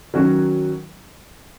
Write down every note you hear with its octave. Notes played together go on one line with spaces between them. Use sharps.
D#3 F#3 C#4 F#4 A#4